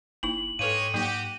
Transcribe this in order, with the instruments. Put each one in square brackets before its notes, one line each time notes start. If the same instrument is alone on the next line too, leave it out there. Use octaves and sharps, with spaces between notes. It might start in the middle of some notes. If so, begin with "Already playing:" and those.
[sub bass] F#1 [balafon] A#3 D#4 E4 [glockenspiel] F#7
[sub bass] G#2 [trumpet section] G#3 G4 C#5 [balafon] A4 B4 F5 [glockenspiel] D#7
[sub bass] G#2 [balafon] F#3 A#3 D#4 [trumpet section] F#4 G4